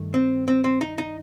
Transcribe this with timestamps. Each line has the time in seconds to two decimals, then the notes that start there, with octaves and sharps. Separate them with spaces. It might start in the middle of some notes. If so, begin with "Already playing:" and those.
Already playing: G2 D#3 A3
0.14 C4
0.48 C4
0.64 C4
0.81 D#4
0.98 D#4